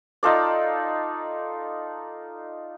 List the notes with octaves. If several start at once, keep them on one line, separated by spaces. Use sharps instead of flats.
D#4 F4 A4 D5